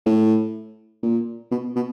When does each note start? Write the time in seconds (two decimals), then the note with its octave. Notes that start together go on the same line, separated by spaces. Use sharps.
0.06 A2
1.03 A#2
1.52 B2
1.76 B2